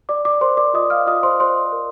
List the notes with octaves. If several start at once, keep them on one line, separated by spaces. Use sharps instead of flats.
D5 D6
D5 D6
A#4 C5 C6
D5 D6
F4 D#5 D#6
F5 F6
F4 D#5 D#6
C5 C6
C5 D5 C6
A#4